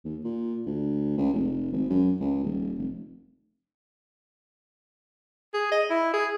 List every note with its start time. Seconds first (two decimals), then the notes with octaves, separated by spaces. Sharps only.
0.05 D#2
0.24 A#2
0.66 D2
1.17 C#2
1.33 F1
1.72 G#1
1.89 F#2
2.20 C#2
2.44 D#1
2.78 F1
5.53 G#4
5.71 D#5
5.90 E4
6.13 G#4